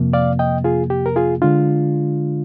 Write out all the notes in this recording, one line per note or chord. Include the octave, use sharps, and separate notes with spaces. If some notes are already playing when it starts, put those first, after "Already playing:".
Already playing: F2 C3 F3 A#3
D5 F5
D#5 G5
F4 G#4
G4
A#4
F4 G#4
D3 G#3 D4 F4